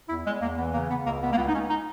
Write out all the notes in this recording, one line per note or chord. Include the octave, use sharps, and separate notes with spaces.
E2 E4
E2 G#3
E2 A#3
E3 B3
C#3 A#3
C#3 B3
C#2 A#3
C#2 B3
A#3
C#2 B3
D#4
C#2 C#4
D#4